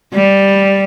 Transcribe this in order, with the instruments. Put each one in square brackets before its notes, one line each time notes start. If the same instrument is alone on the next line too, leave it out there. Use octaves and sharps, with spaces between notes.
[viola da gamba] G3